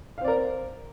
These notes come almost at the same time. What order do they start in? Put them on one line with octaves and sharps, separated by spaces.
F5 C4 D5 A#4